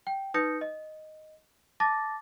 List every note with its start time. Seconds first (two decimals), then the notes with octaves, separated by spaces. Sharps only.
0.07 G5
0.34 D#4 B4 D#6 G6 A#6 C#7
0.61 D#5
1.80 A5 D6 A6 A#6